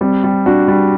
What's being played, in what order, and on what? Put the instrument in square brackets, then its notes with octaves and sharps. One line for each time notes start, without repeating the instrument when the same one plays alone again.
[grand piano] G3 [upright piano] C4
[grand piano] G3
[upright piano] D4 [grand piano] F#4
[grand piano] G3